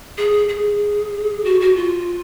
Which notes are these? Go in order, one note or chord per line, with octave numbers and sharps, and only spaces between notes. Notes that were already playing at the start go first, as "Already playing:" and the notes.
G#4
G#4
F#4
F#4
F4